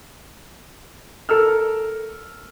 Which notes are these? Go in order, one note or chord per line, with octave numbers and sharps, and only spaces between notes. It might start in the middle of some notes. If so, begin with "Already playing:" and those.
A4 A#4 E6 F6